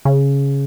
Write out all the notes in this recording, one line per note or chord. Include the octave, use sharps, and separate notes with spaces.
C#3